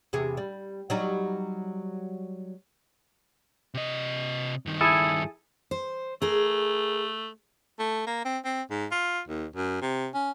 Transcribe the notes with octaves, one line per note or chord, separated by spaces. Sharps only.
E2 C3 G#4
G3
F#3 G3 D#4
C3 D#5
G2 D#3
E4 G#4 A4
C5
A3 G#4 A#4
A3
A#3
C4
C4
G#2
F4
D#2
F#2
C3
C#4